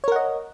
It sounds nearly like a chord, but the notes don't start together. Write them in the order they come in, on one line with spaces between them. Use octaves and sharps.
C#5 A#4 F#5 D#5